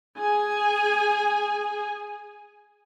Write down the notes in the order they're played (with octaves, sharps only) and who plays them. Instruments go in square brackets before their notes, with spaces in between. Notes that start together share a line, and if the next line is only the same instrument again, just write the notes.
[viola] G#4 G#5